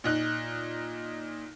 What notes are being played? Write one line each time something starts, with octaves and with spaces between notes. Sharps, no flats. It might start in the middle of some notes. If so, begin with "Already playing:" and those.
A#2 D#4 F#6